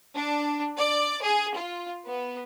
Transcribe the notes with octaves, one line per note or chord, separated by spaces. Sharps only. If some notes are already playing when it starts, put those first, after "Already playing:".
D4
D5
G#4
F4
B3